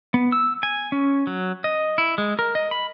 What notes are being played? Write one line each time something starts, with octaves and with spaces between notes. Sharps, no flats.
B3
E6
G#5
C#4
F#3
D#5
E4
G#3
A#4
D#5
B5